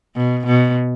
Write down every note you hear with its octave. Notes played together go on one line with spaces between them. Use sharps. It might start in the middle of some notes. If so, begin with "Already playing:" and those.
B2
B2